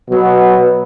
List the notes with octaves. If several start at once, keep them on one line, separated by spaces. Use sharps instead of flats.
B2 F#3 B3